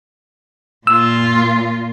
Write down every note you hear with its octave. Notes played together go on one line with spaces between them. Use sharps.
A#2 F4 E6